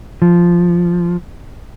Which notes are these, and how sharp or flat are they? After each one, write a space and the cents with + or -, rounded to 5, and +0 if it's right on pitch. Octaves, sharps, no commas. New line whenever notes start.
F3 -5